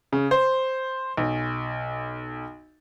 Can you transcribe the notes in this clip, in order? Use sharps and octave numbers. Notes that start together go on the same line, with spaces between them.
C#3
C5
B1